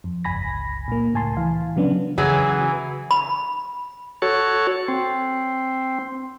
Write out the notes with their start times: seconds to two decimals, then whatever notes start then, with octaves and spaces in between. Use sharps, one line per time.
0.04 F2
0.24 G1 C#2 G#5 B5 A#6
0.88 A#2 A#3
1.14 C#2 A2 G#5 A5 C6
1.37 E3 F5
1.76 C#3 F#3 B3 C#4 D4
2.18 C#3 E3 F#3 G#4
3.11 B5
4.22 F#4 A4 C#5
4.88 C4